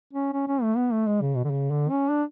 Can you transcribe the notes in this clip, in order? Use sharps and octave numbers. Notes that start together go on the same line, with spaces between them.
C#4
C#4
C#4
A3
B3
A3
G#3
C#3
B2
D3
C#3
D3
C#4
D4